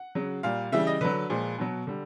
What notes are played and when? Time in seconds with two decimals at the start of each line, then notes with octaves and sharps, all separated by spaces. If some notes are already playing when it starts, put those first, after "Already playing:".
Already playing: F#5
0.15 C#3 F#3
0.43 A#2 G3 F5
0.72 C#3 E3 G3 E5
0.87 D#5
1.01 D3 F#3 B4
1.30 A#2 F3 G#3
1.59 B2 F#3
1.87 D3 G3